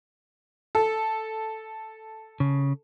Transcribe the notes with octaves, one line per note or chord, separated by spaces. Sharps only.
A4
C#3